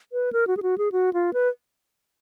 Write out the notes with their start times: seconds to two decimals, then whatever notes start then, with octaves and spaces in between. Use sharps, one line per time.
0.13 B4
0.33 A#4
0.47 F#4
0.57 G#4
0.63 F#4
0.78 G#4
0.92 F#4
1.13 F4
1.33 B4